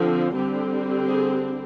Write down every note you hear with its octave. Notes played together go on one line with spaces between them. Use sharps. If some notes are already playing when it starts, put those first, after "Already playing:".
Already playing: D3 F3 C4
D3 G3 C4 G4
G#4